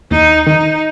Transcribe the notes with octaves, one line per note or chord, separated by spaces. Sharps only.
D#2 D#4
D#3 D#4